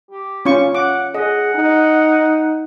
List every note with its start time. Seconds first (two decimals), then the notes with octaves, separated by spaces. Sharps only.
0.11 G4
0.45 C#4 F4 C#6
0.75 F#5 D6
1.14 G#4 D#5 F#5
1.55 D#4